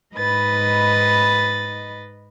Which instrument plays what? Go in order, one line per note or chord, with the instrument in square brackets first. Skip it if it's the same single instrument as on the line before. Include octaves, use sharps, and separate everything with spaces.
[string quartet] G#2 D#4 B4 D#5 B5 A6